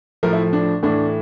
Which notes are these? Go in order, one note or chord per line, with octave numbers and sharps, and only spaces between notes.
A2 F3 A3 A#4
E4
D4
A2 E3 A3 D4